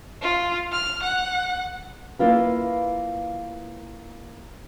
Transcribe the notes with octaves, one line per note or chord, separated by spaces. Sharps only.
F4
F6
F#5
A#3 E4 F4 B4